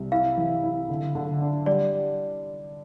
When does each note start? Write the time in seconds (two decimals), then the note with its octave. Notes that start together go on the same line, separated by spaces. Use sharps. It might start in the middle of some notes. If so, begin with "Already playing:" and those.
Already playing: C2
0.11 E4 F5
0.37 E3
0.64 E4
0.89 D3
1.15 D3
1.42 D4
1.66 G3 D5